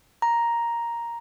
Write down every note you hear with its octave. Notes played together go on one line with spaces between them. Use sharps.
A#5